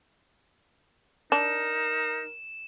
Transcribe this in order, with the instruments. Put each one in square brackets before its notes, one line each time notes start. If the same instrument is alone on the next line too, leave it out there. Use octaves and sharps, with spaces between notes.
[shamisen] D4 [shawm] D#4 [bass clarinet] A#4 [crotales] E7